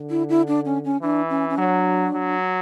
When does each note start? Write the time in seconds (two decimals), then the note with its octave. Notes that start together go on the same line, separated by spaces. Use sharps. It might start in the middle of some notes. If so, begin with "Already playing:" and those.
Already playing: D3
0.10 E4
0.29 E4
0.47 D4
0.65 C#4
0.85 C#4
1.02 E3 D4
1.30 C#4
1.49 C#4
1.58 F#3 D4
2.13 F#3